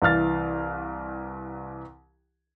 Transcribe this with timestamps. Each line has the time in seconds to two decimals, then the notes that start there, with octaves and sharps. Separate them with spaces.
0.02 C2 E3 F5 F6 A6